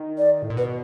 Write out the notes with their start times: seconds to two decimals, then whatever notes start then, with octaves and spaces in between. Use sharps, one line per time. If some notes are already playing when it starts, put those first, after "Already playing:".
Already playing: D#3
0.18 D5
0.42 A2
0.50 A#2
0.57 B2 B4